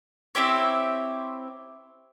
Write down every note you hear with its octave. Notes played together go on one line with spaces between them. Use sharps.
C4 E4 G4 C#5